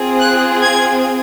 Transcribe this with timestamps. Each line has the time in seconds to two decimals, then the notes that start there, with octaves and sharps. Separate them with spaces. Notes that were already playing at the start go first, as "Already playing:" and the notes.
Already playing: C4 F4 G#4
0.19 F#6
0.62 G#6